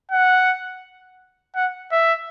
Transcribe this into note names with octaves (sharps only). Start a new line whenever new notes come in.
F#5
F#5
E5